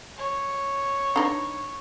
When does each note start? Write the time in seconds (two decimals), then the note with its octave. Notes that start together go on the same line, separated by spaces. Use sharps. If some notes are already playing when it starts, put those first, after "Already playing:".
0.18 C#5
1.16 D4 D#4 B4